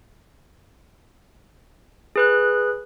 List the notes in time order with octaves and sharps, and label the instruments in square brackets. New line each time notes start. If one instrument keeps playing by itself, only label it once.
[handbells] G#4 B4 F#6